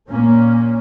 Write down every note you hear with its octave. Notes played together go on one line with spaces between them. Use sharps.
A#2 A#3 C#4